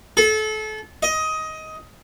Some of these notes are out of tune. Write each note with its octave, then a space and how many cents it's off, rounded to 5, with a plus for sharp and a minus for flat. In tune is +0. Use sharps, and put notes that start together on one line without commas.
A4 -30
D#5 +15